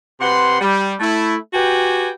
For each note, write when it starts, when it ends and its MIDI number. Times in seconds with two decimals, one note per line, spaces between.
0.20 0.58 48
0.20 0.58 71
0.20 0.58 78
0.20 0.58 84
0.61 0.94 55
1.00 1.36 57
1.00 1.36 64
1.54 2.10 66
1.54 2.10 67
1.54 2.10 71
1.54 2.10 79
1.54 2.10 80